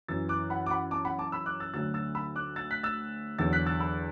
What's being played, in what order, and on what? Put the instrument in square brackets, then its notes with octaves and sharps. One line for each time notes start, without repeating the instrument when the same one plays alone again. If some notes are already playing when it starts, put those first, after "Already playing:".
[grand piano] F#2 E3 E6 A6
D6 F#6
F#5 B5
D6
F#5 B5
A5 D6
F#5 B5
A5 D6
B5 E6
D6 F#6
E6 A6
D2 D3 F#3 E6 A6
E6 A6
B5 E6
D6 F#6
E6 A6
F#6 B6
E6 A6
E2 D3 F#3 E6 A6
F#6 B6
E6 A6
B5 E6